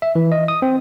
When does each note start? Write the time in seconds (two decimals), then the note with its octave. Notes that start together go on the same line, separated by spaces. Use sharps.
0.02 E5
0.15 E3
0.32 D#5
0.48 D#6
0.62 C4